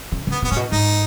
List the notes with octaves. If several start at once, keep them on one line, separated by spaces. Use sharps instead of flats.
C#3
C#3
B3
B2 B3
A2 C#4
B2
G#2 D#4